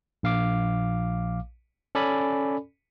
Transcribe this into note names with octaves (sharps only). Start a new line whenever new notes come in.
A#1 F5 D6
C#4 A4 D5 G#5 B5